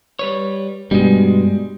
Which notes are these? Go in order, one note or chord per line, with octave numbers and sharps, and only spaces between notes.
G3 B4 C#5
G2 B2 G3 G#3